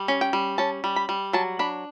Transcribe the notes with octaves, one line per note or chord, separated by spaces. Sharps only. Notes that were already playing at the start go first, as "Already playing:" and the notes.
Already playing: G3
C#4
G5
G3
C#4 A5
G3
B5
G3
F#3 A5
D4 B5